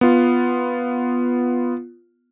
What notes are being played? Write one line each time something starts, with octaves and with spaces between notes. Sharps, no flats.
B3 F4